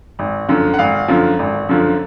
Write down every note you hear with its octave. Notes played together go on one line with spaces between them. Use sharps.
G#1
F#2 D3 F3
F#5
G#1 F5
F#2 D3 F3
G#1
F#2 D3 F3